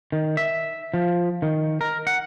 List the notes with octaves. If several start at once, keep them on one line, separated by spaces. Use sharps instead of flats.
D#3
E5
F3
D#3
A#4
F#5